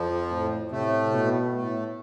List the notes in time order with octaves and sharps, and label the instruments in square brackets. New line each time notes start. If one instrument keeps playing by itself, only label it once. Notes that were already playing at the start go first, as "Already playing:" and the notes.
Already playing: [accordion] F2 F3
[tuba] A2
[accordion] A2 A3 [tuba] C3
[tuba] B2
[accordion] A2 A3